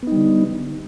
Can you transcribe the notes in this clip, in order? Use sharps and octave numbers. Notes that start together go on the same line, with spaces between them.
D3 G3 B3 D#4